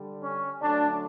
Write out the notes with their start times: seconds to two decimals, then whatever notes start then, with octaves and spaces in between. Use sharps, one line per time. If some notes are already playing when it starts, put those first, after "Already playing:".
Already playing: D3 G3
0.20 C#4
0.61 D3 F#3 A3 D4